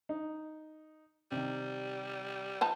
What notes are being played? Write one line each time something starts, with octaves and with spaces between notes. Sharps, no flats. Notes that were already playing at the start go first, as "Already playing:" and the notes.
D#4
C3 D#3 G3
F3 D#4 B4 A5